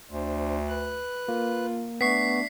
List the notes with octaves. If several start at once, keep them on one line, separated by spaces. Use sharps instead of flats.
D2 D4 C5
B4 F#6
A#3 F4
A3 B3 D4 C#6 B6 C7